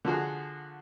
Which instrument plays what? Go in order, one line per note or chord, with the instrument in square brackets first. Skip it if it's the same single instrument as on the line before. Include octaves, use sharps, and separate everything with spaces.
[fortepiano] D3 F3 F#4 G#4